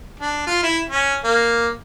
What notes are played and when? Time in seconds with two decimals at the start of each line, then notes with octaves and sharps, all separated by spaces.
0.20 D4
0.47 F4
0.63 E4
0.89 C#4
1.24 A#3